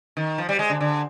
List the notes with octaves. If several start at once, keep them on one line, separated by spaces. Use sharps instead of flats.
D#3
F3
G3
G#3
D3
D3